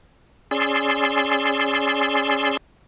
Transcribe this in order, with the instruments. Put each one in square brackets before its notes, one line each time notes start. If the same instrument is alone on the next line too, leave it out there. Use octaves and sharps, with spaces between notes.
[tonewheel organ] C#4 G#4 D5 C6 E6